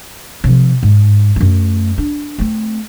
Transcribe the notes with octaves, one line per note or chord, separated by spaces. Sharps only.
C3 F3
G#2
F#2 A3
D4
A3 C4